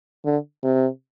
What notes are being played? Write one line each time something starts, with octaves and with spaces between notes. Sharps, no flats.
D3
C3